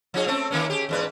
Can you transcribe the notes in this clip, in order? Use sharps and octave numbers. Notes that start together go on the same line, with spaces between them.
F3 D#4 G#4
A3 C4 C#4
D#3 A#3 C#4
G4 G#4
E2 G#2 B4